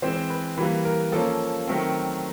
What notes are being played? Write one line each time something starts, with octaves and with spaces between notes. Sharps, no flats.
E3 G#3 C4 C5
B4
E3 G3 A#3 B4
A#4
F3 A#3 C#4 A4
D#3 F#3 A3 C4